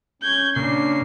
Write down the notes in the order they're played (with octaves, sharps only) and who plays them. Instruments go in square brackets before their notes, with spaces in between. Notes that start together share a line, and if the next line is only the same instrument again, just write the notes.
[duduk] C#4 [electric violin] G6 G#6
[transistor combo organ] A#2 C#3 [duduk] D4 [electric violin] C7